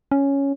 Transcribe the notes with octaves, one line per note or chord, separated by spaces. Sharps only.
C#4